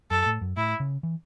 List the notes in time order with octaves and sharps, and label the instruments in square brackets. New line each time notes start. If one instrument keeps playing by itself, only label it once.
[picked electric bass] F#2 [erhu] A4
[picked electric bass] A2
F#2
[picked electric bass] A2 [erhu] E4
[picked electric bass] C#3
E3